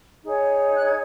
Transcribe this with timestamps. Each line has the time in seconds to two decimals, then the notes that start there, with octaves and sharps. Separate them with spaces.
0.24 D#4 G#4 C#5
0.76 F#6
0.85 G#6